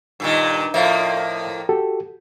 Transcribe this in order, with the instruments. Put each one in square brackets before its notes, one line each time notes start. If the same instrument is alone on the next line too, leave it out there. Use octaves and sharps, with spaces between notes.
[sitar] G2 A#2 D#3
[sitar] A2 F3 A#3 [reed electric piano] E5 F5
[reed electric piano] F#4 G4 A4